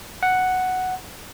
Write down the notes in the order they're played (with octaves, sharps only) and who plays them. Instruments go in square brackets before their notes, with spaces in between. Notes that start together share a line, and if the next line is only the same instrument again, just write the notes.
[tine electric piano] F#5